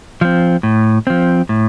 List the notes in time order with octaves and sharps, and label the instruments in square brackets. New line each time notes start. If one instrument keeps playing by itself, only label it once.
[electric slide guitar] F3 C4
A2
F3 C4
A2